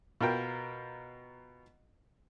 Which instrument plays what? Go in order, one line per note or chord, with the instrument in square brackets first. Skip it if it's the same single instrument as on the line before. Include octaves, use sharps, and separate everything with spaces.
[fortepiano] B2 F4 A#4 G5